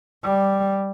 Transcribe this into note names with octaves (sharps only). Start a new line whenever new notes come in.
G3